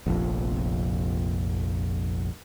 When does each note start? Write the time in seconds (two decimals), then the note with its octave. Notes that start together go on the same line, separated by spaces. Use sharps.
0.06 F1 A#1 F2